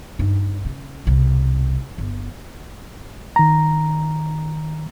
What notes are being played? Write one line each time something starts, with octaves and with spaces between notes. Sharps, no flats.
G2 D#4
C#3
E1 C2
G1
D#3 A#5